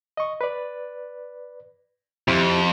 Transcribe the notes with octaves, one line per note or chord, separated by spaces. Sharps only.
D#5 C#6
B4 D5
F2 C4 E4 G4